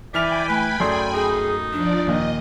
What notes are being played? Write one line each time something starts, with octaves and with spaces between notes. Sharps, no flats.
E3 D5 E5 G5 G#5 B5 F6 F7
A3 B4
F#2 A3 G#4 D5 C6
D#4 G#4
F3 D4 D5
D#2 A#2 D#5